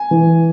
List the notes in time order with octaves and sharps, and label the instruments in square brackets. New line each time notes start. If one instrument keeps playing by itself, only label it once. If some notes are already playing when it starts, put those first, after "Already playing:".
Already playing: [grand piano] G#5
[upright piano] E3